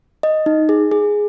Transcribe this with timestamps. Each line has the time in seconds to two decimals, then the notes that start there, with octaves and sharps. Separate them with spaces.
0.23 D#5
0.46 D#4
0.69 G#4
0.91 G#4